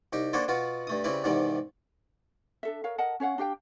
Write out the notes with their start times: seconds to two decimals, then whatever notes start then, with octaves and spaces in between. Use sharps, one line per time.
0.13 C2 D#4 G4
0.33 A#3 D4 F#4 G#4 A4 C5
0.48 B2 B3 F4 F#4
0.87 G2 A3 D#6
1.04 C#3 G3 C4 E4 B4
1.24 G#2 C3 D#3 E3 G3 B3
2.63 D4 A4 E5
2.84 A4 A#4 C#5 F5
2.98 A#4 D#5 F#5 A5
3.20 C#4 C#5 F5 F#5
3.38 D4 G4 F5 G5